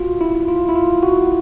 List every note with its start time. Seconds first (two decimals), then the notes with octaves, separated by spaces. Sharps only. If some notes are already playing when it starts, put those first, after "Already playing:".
Already playing: F4 F#4
0.21 E4
0.48 F4
0.69 E4
0.76 F4
1.03 F#4